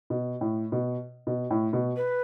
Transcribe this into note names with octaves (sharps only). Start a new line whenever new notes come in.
B2
A2
B2
B2
A2
B2
B4